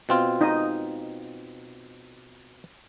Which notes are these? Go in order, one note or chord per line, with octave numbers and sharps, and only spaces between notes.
B2 C4 F4
D#4 D#5